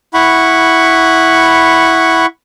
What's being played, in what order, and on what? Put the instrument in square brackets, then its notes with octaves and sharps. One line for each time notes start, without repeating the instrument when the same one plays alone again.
[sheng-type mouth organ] E4 F#5 B5 C#6